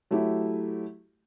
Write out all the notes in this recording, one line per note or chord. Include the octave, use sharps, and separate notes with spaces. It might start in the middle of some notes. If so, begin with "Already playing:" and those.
F#3 A3 E4 G4